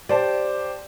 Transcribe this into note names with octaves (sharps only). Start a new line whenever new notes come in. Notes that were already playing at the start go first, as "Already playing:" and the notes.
G4 C5 D5 A5